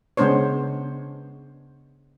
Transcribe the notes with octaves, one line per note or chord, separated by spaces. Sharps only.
C#3 G#3 B3 D4 C5 C#5